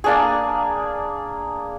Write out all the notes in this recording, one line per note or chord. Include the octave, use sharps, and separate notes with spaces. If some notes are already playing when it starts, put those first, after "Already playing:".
A#3 D4 G#4